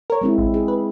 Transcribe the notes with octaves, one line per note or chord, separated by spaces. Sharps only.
A#4 C#5
G#3 C4 E4
A1
G#4
B4